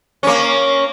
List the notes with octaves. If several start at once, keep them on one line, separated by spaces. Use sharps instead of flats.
A#3 C#4